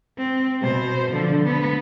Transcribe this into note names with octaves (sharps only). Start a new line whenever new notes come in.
C4
B2 C5
D3 F3
B3